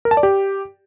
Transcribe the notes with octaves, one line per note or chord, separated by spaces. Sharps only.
A#4
A5
D5
G4